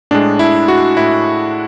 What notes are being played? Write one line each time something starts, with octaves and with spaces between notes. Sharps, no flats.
A2 G#3 D4
E4
F#4
A2 E4